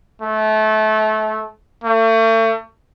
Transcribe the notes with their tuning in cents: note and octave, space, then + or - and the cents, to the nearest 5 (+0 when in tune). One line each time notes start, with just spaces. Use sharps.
A3 -25
A3 +40